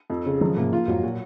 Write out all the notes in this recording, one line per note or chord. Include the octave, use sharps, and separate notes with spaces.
F2
C#3
D#3 F3 F#3
G#2 C3 A#3
F4
F2 G#2 F#3
A#2 F#4